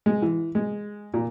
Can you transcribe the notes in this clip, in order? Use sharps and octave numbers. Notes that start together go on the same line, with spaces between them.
G#3
E3
G#3
A#2